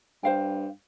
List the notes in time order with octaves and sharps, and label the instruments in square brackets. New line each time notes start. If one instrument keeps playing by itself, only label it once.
[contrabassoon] G2 [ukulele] C5 F5 G5